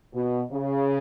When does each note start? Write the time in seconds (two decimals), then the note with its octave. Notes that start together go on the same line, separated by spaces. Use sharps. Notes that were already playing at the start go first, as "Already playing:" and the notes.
0.14 B2
0.52 C#3